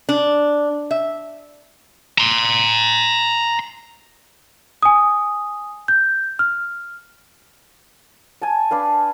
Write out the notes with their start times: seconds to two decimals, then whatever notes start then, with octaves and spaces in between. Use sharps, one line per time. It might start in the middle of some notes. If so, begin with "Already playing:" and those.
0.09 D4
0.91 E5
2.18 A#5 C6
4.83 G#5 D#6
5.88 G6
6.39 F6
8.42 G#5 A5
8.71 D4 B4 F5